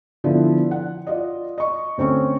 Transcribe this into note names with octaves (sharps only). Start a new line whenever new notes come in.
D3 F3 B3 E4
F#5
F4 D5 D#5
D#5 C#6
D2 C4 C#4 C#6